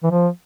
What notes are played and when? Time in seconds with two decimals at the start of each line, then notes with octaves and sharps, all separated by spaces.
0.03 E3
0.11 F3